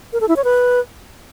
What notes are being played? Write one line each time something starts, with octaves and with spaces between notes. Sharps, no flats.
A#4
A4
E4
C#5
B4